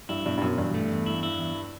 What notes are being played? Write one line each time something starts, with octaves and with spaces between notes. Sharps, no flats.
G2 E4
G2 B2
G2
F#2 B2
E2 G2
A3
E2
E4
E4
E2